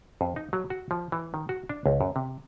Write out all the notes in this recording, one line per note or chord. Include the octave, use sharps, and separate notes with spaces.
F2
D#4
F#3
F#4
F3
E3
D#3
F#4
D4
C#2
F#2
C3